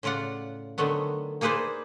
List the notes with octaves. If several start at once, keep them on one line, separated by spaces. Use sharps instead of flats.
A2 C#3 F4 D5 F#5
D3 D#3 F#3 A3 B3
A#3 D#4 G#4 B4 C5 D5